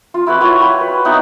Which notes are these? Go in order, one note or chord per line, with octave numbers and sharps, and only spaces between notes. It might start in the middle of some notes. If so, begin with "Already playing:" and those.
F4
E4 F#4 B4 F#5
F4 C#5 F#5
F#4 B4 G5
B4
B3 D#4 E4 F#5